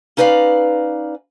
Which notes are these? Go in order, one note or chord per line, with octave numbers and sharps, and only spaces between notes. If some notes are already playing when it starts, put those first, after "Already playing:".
C#4 D#4 B4 D5 D#5 F5